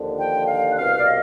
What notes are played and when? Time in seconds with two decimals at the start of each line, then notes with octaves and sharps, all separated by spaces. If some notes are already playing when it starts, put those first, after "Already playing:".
Already playing: D#2 D3 F3
0.19 G5
0.48 F5
0.72 F#5
0.78 C2 B2 F5
0.98 D5
1.05 D#5